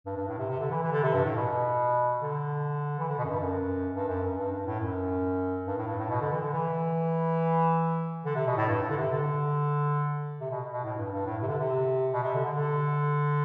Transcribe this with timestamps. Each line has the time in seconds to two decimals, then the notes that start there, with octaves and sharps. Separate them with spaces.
0.06 G2
0.17 G2
0.28 A2
0.38 C3
0.49 C3
0.60 D3
0.71 E3
0.82 E3
0.92 D3
1.03 C3
1.14 G2
1.24 A2
1.36 B2
2.22 D3
2.99 E3
3.08 D3
3.18 B2
3.25 F#2
3.29 G2
3.40 F#2
3.95 G2
4.08 F#2
4.23 F#2
4.37 G2
4.51 G2
4.66 A2
4.80 F#2
5.67 G2
5.78 A2
5.88 G2
5.99 A2
6.10 B2
6.21 D3
6.32 E3
6.42 D3
6.53 E3
8.25 D3
8.35 C3
8.47 B2
8.57 A2
8.68 G2
8.82 A2
8.90 D3
8.97 C3
9.12 D3
10.41 C3
10.51 B2
10.73 B2
10.84 A2
10.97 G2
11.12 G2
11.26 A2
11.42 C3
11.48 D3
11.59 C3
12.13 B2
12.23 C3
12.35 D3
12.45 D3
12.56 D3